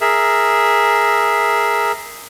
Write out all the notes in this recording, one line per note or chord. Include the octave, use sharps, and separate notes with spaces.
G#4 A#4 E5